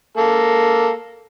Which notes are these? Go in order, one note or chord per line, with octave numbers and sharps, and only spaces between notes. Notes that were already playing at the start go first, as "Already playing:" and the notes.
A#3 A4